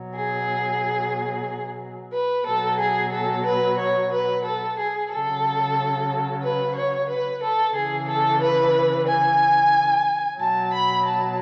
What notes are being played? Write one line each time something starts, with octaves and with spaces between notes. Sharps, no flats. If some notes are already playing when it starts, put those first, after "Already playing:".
Already playing: B2 F#3
G#4
B4
B2 F#3 A4
G#4
A4
B4
C#5
B4
A4
G#4
C#3 F#3 A4
B4
C#5
B4
A4
C#3 E3 G#4
A4
B4
G#5
B2 F#3 A5
B5
A5